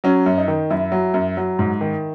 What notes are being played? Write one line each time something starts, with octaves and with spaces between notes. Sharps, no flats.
F#3 C#4
F#2
D#4
D#3
F#2 E4
F#3
F#2
F#3
G#2
D#3